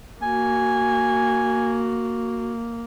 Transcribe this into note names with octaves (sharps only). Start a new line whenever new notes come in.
A#3 F#4 G#5